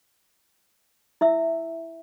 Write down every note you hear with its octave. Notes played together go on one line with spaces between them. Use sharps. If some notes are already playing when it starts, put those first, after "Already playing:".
E4 E5 E6